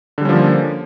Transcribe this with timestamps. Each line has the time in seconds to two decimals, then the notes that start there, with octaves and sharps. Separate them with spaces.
0.18 D3
0.21 G3
0.25 C#4
0.29 F3
0.33 A#3